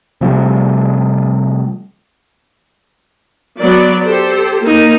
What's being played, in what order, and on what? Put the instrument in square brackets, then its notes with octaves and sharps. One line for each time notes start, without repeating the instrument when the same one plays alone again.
[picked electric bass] C3 F3 G3 A3
[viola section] F#3 B3 D5
G4 A4 C5
A#3 D#4